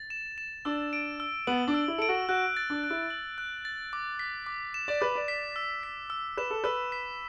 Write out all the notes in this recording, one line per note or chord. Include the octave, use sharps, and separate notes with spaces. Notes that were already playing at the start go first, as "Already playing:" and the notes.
Already playing: A6
E7
E7
D4 E6
D7
E6
B3 F#7
D4
E6
E4
A4 D7
F#4
F#4 F#6
A6
D4
F#6
E4
F#7
F#6
A6
D6
B6
D6
E7
D5
B4 D6
D5
B6
E6
B6
E6
B4 E7
A4
B4 E6
B6